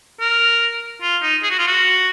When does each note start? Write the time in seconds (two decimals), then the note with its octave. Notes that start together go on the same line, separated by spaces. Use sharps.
0.21 A#4
1.02 F4
1.22 D#4
1.43 G#4
1.51 F#4
1.59 F4
1.67 F#4